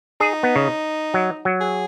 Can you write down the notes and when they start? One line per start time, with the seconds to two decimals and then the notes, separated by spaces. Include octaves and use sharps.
0.20 D#4 G#4
0.43 B3
0.56 C#3
1.14 F#3
1.45 F#3
1.61 G#4